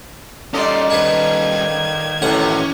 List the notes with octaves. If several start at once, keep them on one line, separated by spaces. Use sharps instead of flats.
A#2 G3 C#4 A4 D5 D#5 C6
D#3 D4 B4 G#6
A1 F#2 C3 C#4 D4 F#5